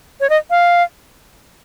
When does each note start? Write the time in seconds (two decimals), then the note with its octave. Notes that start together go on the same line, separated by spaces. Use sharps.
0.20 C#5
0.30 D#5
0.50 F5